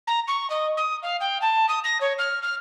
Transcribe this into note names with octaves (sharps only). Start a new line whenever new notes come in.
A#5
C#6
D#5
D#6
F5
G5
A5
D#6
A#6
C#5
F6
F6